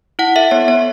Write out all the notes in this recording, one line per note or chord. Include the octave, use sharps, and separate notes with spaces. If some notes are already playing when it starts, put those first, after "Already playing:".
E4 F#5
A4 E5
B3 C#5
B3 C#5